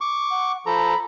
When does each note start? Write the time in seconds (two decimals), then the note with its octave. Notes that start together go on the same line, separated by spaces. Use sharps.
0.01 C#6 D6
0.31 F#5
0.66 F3 A4 A#5 B5